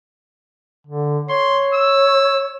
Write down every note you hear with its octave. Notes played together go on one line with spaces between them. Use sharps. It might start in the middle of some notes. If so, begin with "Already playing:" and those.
D3
C#5 C6
E6